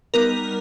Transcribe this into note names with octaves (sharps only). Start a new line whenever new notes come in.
G3 B3 D#4 A#4